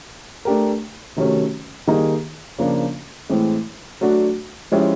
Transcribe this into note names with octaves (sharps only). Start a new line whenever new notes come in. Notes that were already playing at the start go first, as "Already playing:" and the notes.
A3 D4 G4 A#4
C3 D#3 F#3 A3 C#4
D#3 G3 A#3 D#4 G#4
C#3 F3 A#3 D4
A2 E3 G#3 C4
F#3 A3 D4 F#4
F3 G#3 C#4 E4 G4